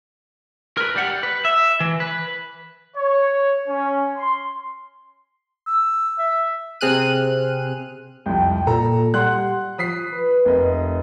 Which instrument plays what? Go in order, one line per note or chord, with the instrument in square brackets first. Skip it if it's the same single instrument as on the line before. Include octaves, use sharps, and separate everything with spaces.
[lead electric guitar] A#4 B4
G3 F#5
B4
E5
E3
B4
[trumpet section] C#5
C#4
C6
[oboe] E6
E5
[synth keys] C3 C4 G#4 F6 F#6 D#7
[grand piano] C2 F2 [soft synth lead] G5
[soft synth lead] A#2 [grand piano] A4 A#5
[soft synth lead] G3 [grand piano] F#5 C6 F#6
[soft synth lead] F3 [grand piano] D#6 B6 C7
[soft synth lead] B4
[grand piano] F1 A#4 D#5